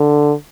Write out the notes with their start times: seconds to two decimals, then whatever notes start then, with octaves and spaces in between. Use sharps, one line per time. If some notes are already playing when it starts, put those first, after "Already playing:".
Already playing: D3